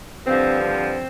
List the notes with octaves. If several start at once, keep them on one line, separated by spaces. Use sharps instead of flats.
G2 D3 F3 C4
C4